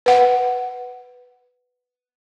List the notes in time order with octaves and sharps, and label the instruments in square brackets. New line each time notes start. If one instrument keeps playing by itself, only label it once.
[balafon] B4 F#5